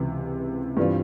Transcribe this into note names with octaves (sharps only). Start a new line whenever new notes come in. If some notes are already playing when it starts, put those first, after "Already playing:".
Already playing: C#2 C3 E3
G2 E3 G3 C4 F4